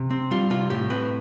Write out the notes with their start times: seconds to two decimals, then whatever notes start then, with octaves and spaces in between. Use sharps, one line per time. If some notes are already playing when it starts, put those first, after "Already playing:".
Already playing: C3
0.11 C4
0.31 G3 F4
0.50 C3 F4
0.70 A2 G4
0.90 C4 B4